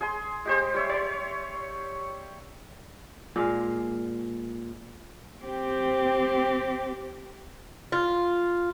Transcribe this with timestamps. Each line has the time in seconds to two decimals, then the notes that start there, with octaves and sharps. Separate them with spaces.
0.01 G#4 G#5 C6
0.46 G#3 G4 C5
0.74 G3 C#5 E5
0.89 C#5 C6
3.36 A#2 G#3 F5
5.44 C4 G4
7.92 F4